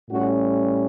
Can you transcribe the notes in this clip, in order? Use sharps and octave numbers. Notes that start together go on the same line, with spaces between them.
A2 G3 C#4 F#4